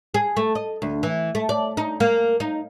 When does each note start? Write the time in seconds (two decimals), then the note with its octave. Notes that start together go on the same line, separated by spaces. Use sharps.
0.14 G#4
0.37 A3
0.55 D#5
0.82 D2
1.03 E3
1.35 A3
1.49 D5
1.77 D#4
2.00 A#3
2.40 D#4